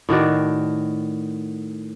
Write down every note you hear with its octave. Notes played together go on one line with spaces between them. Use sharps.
A2 D#3 F#4 D5